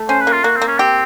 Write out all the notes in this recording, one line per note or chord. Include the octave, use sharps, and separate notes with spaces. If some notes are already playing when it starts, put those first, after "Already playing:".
Already playing: A3
C#4 C5
B4
A#3
F4
A#3 F#4
C4
A#3
C#4
C4 G4